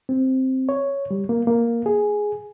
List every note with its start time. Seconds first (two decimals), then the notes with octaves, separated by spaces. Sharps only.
0.09 C4
0.69 C#5
1.11 G3
1.29 A#3
1.47 A#3
1.86 G#4